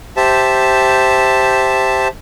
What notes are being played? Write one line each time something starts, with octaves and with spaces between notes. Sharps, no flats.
G4 C5 E5 A5